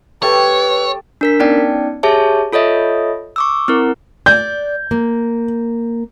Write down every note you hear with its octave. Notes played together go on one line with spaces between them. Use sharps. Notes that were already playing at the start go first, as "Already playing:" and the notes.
A3 G4 A4 B4 C#5
D4 A#4 B6
B3 C#4 D#4 D5 G5
G4 G#4 C#5 E5 A5
F4 A4 C#5 D#5 E5
C#6 D6 E6
C4 E4 A#4
D5 G6
A#3